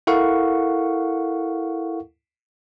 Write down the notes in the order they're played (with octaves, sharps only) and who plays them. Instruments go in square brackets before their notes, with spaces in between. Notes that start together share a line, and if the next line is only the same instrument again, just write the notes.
[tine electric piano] E4 A4 A#4 F5 F#5 C#6